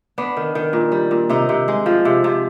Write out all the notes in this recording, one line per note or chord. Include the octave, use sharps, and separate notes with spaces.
B3 D4
D#3
D#3
A#2
G3
A#2
C3 D#4
C3
G#3
F3
C3
C3